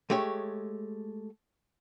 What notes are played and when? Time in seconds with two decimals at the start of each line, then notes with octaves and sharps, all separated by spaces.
0.10 G#3 A3 G4 C#5